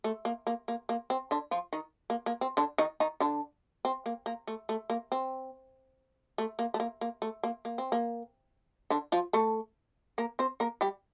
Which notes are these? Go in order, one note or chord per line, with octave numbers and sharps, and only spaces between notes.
A3
A#3
A#3
A#3
A#3
C4
D3 D4
F3 F4
D#3 D#4
A#3
A#3
C4
D3 D4
D#3 D#4
D#3 D#4
D3 D4
C4
A#3
A#3
A3
A3
A#3
C4
A3
A#3
A3
A#3
A#3
A3
A#3
A#3
C4
A#3
D3 D4
F3 F4
A3 A4
A#3 A#4
C4 C5
A#3 A#4
G3 G4